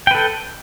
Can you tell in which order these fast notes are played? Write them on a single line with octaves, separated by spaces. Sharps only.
G5 B4 A4